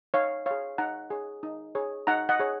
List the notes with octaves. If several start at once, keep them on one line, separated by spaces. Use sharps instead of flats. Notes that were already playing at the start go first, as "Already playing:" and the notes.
D#4 C#5 F5
G#4 C#5 F5
D#4 F#5 A#5
G#4 C#5
D#4
G#4 C#5
D#4 F#5 A#5
D#5 F#5
G#4 C#5